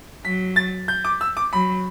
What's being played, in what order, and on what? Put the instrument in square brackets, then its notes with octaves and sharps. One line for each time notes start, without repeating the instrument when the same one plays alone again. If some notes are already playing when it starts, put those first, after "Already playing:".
[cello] F#3 [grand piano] B6
[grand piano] A6
G6
D6
E6
D6
[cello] F#3 [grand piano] B5